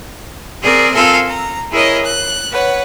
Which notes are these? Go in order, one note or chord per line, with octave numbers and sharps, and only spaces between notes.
C4 G#4 A#4 D5
C4 F4 A4 A#4 F5 G#5
A#5
E4 G#4 A#4 C#5 D#5
F#6
B4 C#5 F#5